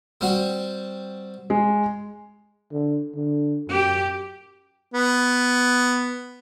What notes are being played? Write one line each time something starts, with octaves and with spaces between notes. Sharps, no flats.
G3 C4 F#4
G#3
D3
D3
F#2 G4
B3